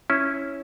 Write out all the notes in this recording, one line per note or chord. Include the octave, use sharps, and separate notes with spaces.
C#4 E4